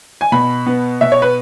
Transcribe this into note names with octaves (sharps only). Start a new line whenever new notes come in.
G#5
B2 B5
B3
B2 E5
C#5
B4